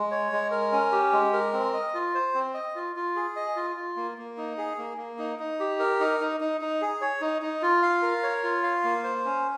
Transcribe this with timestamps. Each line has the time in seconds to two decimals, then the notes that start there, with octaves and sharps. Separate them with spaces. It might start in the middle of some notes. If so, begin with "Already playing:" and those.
Already playing: G#3
0.11 C#5
0.32 G#3
0.51 A#4
0.72 C#4
0.92 G4
1.13 G#3
1.33 A#4
1.53 C4
1.74 D#5
1.94 F4
2.15 C5
2.34 C4
2.54 D#5
2.76 F4
2.96 F4
3.16 G#4
3.36 D#5
3.56 F4
3.76 F4
3.96 A#3
4.18 A#3
4.38 D#4
4.58 G#4
4.78 A#3
4.98 A#3
5.19 D#4
5.39 D#4
5.60 G4
5.79 A#4
6.00 D#4
6.20 D#4
6.40 D#4
6.61 D#4
6.81 G#4
7.01 C#5
7.21 D#4
7.42 D#4
7.62 F4
7.83 F5
8.02 A#4
8.23 C#5
8.43 F4
8.63 F5
8.84 A#3
9.04 C5
9.25 C#4